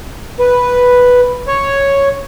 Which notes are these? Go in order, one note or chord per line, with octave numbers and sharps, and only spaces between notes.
B4
C#5